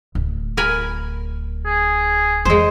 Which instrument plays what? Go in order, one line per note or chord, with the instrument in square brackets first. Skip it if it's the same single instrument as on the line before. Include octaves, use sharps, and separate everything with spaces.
[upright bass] D1
[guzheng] A#4 G#5 B5
[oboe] G#4
[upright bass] E2 D#3 [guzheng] G#3 C5